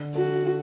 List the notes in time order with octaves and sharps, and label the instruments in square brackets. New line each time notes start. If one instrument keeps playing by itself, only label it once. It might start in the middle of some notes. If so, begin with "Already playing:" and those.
Already playing: [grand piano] D3
[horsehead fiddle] F#4 [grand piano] A4